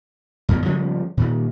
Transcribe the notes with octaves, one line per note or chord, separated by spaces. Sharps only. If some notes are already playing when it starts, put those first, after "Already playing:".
F#2 B2 D#3
C#3 F3 G3 C#4
A#2 D#3